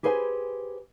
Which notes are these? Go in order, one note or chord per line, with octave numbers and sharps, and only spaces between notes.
G4 G#4 B4 C5 F5 G#5